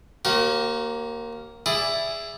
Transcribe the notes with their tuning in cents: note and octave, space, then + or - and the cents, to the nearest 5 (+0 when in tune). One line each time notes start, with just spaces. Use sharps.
A#3 +0 G4 -45 C#5 -40
E4 +10 G#4 -15 D5 +0